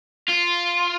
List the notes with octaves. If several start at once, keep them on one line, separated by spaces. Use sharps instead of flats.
F4